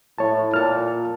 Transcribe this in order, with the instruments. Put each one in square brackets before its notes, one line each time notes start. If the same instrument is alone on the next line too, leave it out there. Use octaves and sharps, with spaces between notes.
[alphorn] A2 [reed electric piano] C#5 A5
[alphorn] A#2 [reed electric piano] A5 F6